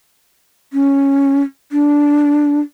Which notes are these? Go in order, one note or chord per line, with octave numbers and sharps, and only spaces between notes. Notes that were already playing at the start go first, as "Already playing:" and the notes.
C#4
D4